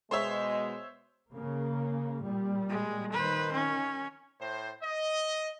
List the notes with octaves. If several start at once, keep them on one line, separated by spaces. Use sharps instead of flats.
B2 G#3 C5 C#5 E5
C#3 A#3
A#2 G3
G#3
D#3 B4 C5
C#4
A2 C5
D#5